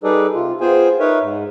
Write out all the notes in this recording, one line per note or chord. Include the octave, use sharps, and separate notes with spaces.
G3 D#4 G#4 A4 B4 D5
C3 F4
B3 F4 G#4 C5 G5 G#5
D#4 A#4 B4 C#5 E5
G#2